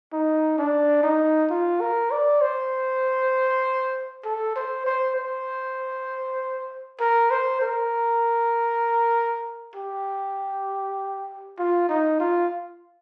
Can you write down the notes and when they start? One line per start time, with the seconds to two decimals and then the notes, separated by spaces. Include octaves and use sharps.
0.13 D#4
0.58 D4
1.04 D#4
1.50 F4
1.81 A#4
2.11 D5
2.41 C5
4.25 A4
4.56 C5
4.86 C5
5.16 C5
7.00 A#4
7.31 C5
7.61 A#4
9.75 G4
11.59 F4
11.89 D#4
12.20 F4